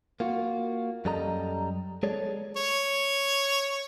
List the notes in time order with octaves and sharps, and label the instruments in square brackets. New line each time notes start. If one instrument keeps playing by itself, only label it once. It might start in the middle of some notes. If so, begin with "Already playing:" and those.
[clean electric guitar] A#3 F4 F#4
F#2 G3 A4 D#5 A#5
G#3 G#4 A4 C#5 D5
[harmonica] C#5